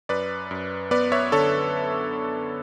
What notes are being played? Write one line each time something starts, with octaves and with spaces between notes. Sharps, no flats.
F#2 B4 D5
F#2
B3 B4 D5
C#5 E5
D3 A4 C#5